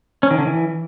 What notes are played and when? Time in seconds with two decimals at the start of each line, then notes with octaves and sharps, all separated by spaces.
0.23 C#4
0.31 D#3
0.38 D3
0.46 E3